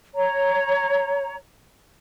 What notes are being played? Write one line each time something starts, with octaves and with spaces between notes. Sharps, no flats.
C#5 A#5